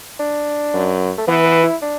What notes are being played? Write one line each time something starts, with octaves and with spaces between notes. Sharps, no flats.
D4
F#2
A3
E3 B3
B3
E4
D4